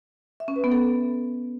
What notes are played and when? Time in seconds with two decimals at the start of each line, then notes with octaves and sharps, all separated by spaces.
0.40 E5
0.48 C#4
0.56 B4
0.64 B3
0.72 A4